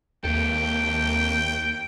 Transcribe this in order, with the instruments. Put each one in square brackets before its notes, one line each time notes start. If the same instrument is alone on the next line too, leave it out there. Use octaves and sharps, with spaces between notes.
[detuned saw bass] D#2 [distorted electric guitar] A#3 A4 [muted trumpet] G5